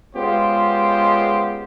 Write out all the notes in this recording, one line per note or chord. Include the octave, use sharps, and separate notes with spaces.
G#3 B3 C#4 F4 G4 C5